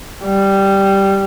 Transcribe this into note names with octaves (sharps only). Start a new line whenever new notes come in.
G3